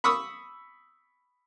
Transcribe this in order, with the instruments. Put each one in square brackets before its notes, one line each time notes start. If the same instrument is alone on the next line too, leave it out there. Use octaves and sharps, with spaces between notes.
[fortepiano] B5 C#6 D#6 E6